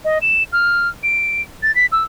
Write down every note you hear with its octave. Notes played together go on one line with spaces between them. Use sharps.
D#5
E7
F6
D7
A6
B6
E6